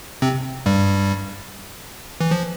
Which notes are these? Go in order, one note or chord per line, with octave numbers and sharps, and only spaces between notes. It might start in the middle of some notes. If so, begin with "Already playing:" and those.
C3 C4
G2 G3
E3
F3